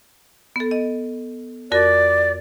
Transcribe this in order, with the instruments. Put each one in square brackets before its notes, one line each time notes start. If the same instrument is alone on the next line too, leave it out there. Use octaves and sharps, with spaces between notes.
[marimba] B3 A4
D#5
[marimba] F2 F#4 A#4 [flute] D5